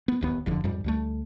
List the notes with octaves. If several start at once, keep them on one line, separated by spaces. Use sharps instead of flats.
B3
D1 D#2 B3
F1 F2 D3
F2 G#2 G3
D2 G3 A3